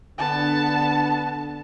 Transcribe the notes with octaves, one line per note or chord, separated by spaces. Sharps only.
D3 B3 A5